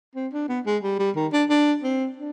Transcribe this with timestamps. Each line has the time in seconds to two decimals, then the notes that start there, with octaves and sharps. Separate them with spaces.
0.16 C4
0.33 D4
0.49 B3
0.66 G#3
0.83 G3
0.99 G3
1.16 D#3
1.33 D4
1.50 D4
1.83 C4
2.17 D4